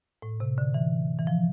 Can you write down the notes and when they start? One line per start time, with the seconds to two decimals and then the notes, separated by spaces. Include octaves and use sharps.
0.22 A2
0.40 C3
0.58 D3
0.74 E3
1.19 E3
1.27 F3